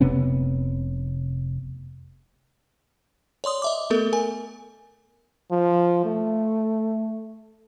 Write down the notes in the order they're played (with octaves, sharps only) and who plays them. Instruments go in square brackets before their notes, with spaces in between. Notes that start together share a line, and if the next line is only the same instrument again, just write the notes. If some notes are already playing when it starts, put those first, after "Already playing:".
[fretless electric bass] F1 C3 B3 C#4
[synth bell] C#5 D5 C6 D#6
D#5 E5 D6
A3 B3 A4 A#4
A#4 G#5
[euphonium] F3
A3